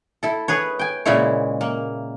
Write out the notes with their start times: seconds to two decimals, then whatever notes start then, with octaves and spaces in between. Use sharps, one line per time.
0.23 E4 A4
0.48 G#4 B4 C#5
0.79 G5 G#5
1.05 A#2 C#3 G#3 E4 C#5
1.61 A#3